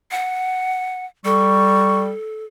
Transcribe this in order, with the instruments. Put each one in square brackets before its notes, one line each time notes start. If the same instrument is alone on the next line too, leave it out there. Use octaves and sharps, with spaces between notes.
[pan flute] F#5
[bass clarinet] G3 [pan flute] A4 [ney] C#6